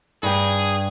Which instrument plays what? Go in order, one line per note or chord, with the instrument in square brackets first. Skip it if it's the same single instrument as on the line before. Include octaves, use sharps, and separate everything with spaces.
[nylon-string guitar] G2 G5 [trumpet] G#4